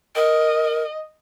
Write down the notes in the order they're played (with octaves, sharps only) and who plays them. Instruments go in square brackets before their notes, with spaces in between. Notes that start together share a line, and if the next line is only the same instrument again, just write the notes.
[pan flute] A#4 [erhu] D#5